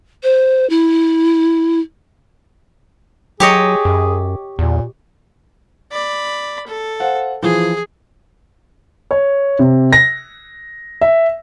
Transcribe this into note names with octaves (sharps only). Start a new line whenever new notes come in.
C5
E4
F#3 G4 G#4 C#5 D#5
F#2
E2 A#2
D5 B5
A4
C5 F5 F#5
E3 F3 G#4
C#5
C3
A#6
E5